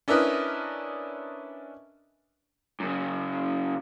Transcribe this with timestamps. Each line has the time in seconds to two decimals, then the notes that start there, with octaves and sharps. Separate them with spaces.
0.08 C#4 D4 E4 A#4 B4 D#5
2.80 F#2 C#3